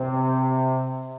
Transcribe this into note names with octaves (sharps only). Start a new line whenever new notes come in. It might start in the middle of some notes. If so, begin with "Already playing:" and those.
Already playing: C3